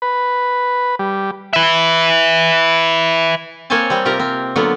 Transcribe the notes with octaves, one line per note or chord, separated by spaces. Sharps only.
B4
G3
B4 E5
A#3 C4 C5 C#5 G#5 A5
G3 C4
C3 F4 G4 A#4 A#5
C4
D3 F#3 A#3 B3 F4